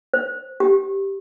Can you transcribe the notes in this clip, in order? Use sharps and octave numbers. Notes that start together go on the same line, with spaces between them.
C5
G4